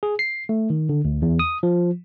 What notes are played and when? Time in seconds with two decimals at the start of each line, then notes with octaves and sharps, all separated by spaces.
0.03 G#4
0.19 C7
0.49 A3
0.70 D#3
0.89 D3
1.05 D2
1.22 E2
1.39 D#6
1.63 F3